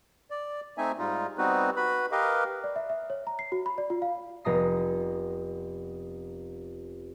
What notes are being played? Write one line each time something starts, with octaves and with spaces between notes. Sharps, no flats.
D5
A3 C4 D#4 E5 G#5
G#2 G3 G#3 D#4 F4
G3 B3 C4 D#4 F#4 B4
F#4 B4 B5
G4 A#4 B4 D#5 F5
D5
E5
E5
C#5
A#5
C7
F#4
B5
D5
F4
F5
F1 B3 A#5 D#6 C7